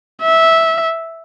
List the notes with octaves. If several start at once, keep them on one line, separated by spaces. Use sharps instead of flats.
E5